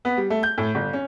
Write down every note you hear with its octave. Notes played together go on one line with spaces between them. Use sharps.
B3
G3
A3
G6
A2
G1
C#4